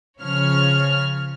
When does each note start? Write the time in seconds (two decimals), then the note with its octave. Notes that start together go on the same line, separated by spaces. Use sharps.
0.21 C#3 F3 C#5 F6